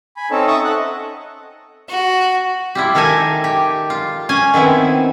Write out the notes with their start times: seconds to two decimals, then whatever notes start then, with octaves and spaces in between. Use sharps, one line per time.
0.17 G#5 B5
0.31 C4 C#4 D#4 A4
0.47 D#5 E5 A5 C#6 D#6
0.64 A4 F#5 F#6
0.78 D#5
1.89 F#4
2.75 E4 F4 G4
2.95 D#3 A4 A#4 E5 G#5
3.44 G4
3.90 F4
4.29 C#4 G#5
4.54 D#3 B3 C4 E4